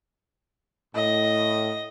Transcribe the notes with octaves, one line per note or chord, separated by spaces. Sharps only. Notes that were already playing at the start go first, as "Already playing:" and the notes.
A2 D#5